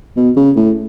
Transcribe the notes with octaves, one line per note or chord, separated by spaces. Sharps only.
B2
C#3
A2